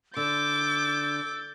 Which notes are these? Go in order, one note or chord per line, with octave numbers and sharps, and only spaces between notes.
D3 D6 E6 G6 A6